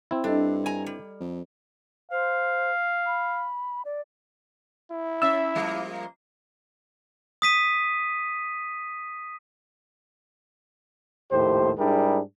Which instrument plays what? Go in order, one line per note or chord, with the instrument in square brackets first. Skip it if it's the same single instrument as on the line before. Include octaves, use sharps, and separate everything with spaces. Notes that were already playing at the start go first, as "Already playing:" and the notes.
[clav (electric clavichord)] C4 E4
[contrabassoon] G2 [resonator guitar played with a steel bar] D4 [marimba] A4 D#5
[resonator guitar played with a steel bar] G#5 A#5
G3
[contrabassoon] F2
[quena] C5 [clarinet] F5
[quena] B5
D5
[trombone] E4
[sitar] C#4 E5 [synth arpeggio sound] E6
[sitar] F3 G3 A#3
[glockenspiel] D#6 B6 D#7
[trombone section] A#1 D#2 A2 G4 C5
G#2 G3 D4 E4 G#4 A#4